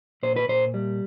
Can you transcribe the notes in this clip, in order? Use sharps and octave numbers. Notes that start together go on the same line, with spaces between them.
A#2 C5
B4
A#2 C5
G3